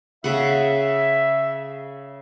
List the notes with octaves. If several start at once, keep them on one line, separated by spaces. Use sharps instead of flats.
C#3 E5 F#5